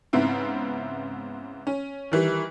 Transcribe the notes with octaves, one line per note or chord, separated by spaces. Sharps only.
G#2 C#3 B3 C4 E4
C#4
D#3 E3 G3